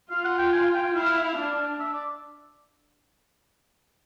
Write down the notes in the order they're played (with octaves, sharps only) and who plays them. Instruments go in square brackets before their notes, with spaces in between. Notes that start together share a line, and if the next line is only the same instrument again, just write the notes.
[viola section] F4 [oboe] F5
[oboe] F#5
G5
G#5
G5
[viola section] E4 [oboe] F5
[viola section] D4
[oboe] E5
D5